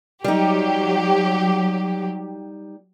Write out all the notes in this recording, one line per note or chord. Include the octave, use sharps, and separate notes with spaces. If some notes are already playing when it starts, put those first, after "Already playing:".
F#3 G3 D#4 G4